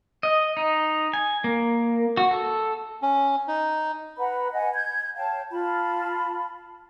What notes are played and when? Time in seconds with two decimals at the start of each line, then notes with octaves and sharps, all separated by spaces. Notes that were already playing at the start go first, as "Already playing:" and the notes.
0.23 D#5
0.57 D#4
1.14 G#5
1.44 A#3
2.17 F#4
2.31 A4
3.02 C#4
3.48 D#4
4.18 B4 F#5 A#5 B5
4.53 D#5 F#5 G#5
4.74 G6 G#6
5.16 C#5 F5 G5 A5
5.51 F4 A5 B5